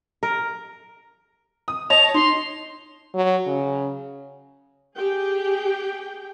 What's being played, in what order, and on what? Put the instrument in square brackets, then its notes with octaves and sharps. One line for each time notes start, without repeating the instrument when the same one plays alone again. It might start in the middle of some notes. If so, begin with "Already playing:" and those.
[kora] A#4
[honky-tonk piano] D#6
[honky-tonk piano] C#5 D#5 A5 [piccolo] F7
[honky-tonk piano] D#4 [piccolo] C6
[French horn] F#3
C#3
[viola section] G4 G#4 G5